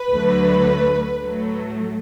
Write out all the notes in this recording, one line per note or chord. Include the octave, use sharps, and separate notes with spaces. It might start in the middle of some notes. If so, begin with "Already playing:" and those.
Already playing: B4
D2 D3 F#3 A3
A2 F#3 A3